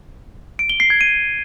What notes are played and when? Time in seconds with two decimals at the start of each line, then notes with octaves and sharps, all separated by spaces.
0.59 D7
0.70 G7
0.80 C7
0.90 G#6
1.01 D#7